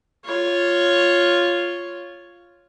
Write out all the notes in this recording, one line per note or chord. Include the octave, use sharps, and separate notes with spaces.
F4 C#5